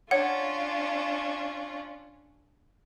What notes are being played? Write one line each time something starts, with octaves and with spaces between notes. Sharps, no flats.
C#4 D4 F4 C#5 F#5